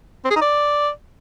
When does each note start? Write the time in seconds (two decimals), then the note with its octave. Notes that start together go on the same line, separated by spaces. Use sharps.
0.25 C4
0.30 G#4
0.36 D#4
0.41 D5